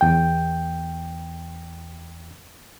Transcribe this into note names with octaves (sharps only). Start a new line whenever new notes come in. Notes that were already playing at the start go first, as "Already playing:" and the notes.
E2 G5